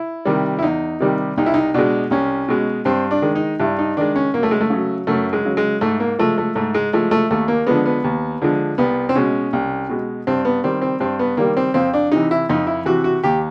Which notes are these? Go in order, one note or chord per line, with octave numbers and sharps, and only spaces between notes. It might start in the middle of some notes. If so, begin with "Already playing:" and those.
Already playing: E4
C3 D#3 G3
E4
E2 D#4
C3 D#3 G3
C2 D#4
E4
D#4
B2 G#3 D4
C2 C#4
B2 G#3
G2 C4
D4
D#3 G#3
D#4
G2 E4
D#4
D#3 G#3 D4
C#4
F#2 A#3
A3
G#3
A3
C#3 F#3
F#2 A3
G#3
C#3 F#3
G#3
G#2 A3
A#3
F3 G#3 A3
A3
G#2 A3
G#3
F3 G#3 A3
A3
D#2 A3
A#3
D3 F3 G#3 B3
B3
D#2
D3 F3 G#3
C2 B3
C4
B2 G#3 C#4
C2
B2 G#3
G2 C4
B3
D#3 G3 C4
C4
G2 C4
B3
D#3 G3 A#3
C4
F2 C4
D4
C3 E3 D#4
E4
F2 D#4
E4
C3 E3 F#4
F#4
D#2 G4